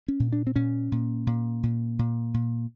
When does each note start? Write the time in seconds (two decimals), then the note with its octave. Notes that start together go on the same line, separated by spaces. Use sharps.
0.08 C#4
0.20 A#2
0.32 D4
0.47 C4
0.55 A#2 C#4
0.92 A#2
1.27 A#2
1.63 A#2
1.99 A#2
2.34 A#2